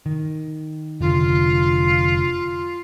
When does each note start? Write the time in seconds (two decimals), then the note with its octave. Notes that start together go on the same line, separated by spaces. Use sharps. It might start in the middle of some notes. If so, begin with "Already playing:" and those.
0.06 D#3
1.01 F1 D3 F4